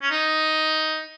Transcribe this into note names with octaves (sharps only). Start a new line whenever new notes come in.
C#4
D#4